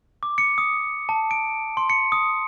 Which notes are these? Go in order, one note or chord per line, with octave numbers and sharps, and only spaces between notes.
D6
C#7
D#6
A5
D7
C6
C#7
D#6